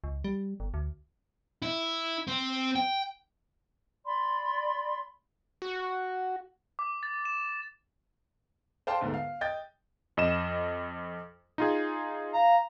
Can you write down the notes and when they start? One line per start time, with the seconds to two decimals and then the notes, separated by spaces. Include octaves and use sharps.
0.04 C#2
0.24 G3
0.60 G1
0.74 D2
1.63 E4
2.28 C4
2.76 G5
4.05 D5 B5 C6
5.62 F#4
6.79 D6
7.03 A6
7.25 E7
8.87 C5 D5 F5 G5 A5 C6
9.01 G1 D2 G#2
9.14 F5
9.41 D#5 G5 G6 A6
10.17 F2 D#5 E7
11.58 D#4 F4 G#4
12.34 F5 A#5